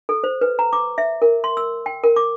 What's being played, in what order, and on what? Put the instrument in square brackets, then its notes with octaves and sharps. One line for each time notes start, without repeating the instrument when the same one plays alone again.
[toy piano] A4
C5
B4
A#5
D6
E5
A#4
C6
E6
G5
A#4
D6